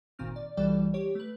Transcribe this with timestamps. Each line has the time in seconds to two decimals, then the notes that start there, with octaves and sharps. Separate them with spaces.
0.19 G#1 A#2 D#3 C4 F6
0.36 D5
0.57 B1 E3 G3 A4 D5 G5
0.94 G4 C#5
1.15 A3 B4